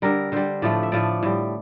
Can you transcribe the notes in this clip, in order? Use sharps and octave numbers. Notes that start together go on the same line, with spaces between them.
D3 G3 A#4
D3 G3 C5
A2 F3 A3 D5
E5
A2 F3 A3 D5
A2 G3